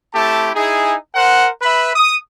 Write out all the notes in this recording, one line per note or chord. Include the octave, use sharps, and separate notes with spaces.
A3 C4 E4 G4 A5
D#4 E4 G#4
A#4 C5 F#5
B4 E5 B5
D#6